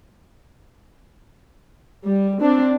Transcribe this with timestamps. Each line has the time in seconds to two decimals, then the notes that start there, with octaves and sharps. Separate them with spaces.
2.05 G3
2.42 C4 D4